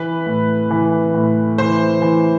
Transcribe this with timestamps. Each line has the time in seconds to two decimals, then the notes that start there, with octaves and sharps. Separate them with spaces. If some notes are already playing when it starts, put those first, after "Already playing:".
Already playing: E3 B4
0.26 A2
0.71 E3
1.14 A2
1.58 E3 C5
2.02 E3